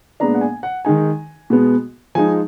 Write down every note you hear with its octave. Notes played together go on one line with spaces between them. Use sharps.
A#2 G#3 B3 D4 A#5
F#5
G#5
F#5
D#3 G#3 D#4 G#5
B2 G#3 B3
F3 G#3 D#4 G#5